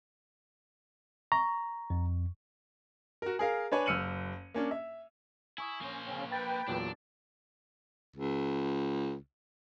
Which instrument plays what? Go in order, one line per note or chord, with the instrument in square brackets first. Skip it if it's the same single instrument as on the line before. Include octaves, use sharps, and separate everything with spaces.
[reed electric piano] A#5 [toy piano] C#6
[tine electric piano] F2
[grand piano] F#4 A#4
G#4 A#4 F5
D4 B4 C#5 G#5
F#1 E6 F6 C#7 D#7 F#7
A#3 C#4 D4
E5
[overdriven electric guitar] E4 [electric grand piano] G#5 C#6 D#6
[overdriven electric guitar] A#3 C5 [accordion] C#4
[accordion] C#3 C4 C#4
[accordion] B4 G5 [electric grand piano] B5 A6
[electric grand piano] E2 A#2 F#3 [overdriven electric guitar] D4
[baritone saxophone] C#2